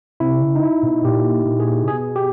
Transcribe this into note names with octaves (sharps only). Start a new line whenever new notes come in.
C3 E4
C#3
D#4
E4
B2
A#2 G4
A#2
G#4
C3
B2 G#4
G4